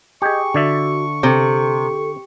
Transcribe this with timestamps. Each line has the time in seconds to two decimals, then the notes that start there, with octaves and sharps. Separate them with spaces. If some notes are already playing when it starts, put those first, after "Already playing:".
0.22 G4 G#4 D#5 C#6
0.54 D3 F#4 D5 E5
1.23 C3 A4